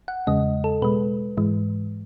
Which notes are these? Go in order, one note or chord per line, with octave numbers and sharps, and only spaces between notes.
F#5
E2 C#3 G#3 D#5
A4
B2 G#3 B4
G#2 E3 G#3